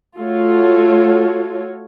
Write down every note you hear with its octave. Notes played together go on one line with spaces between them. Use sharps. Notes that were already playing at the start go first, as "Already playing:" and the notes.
A3 F4 F#4 A4 C#5